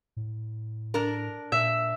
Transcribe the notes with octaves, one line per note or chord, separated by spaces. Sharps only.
A2
D4 A#4
A#2 E5